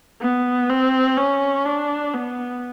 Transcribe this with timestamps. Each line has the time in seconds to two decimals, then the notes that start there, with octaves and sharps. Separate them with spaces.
0.21 B3
0.69 C4
1.17 C#4
1.65 D4
2.13 B3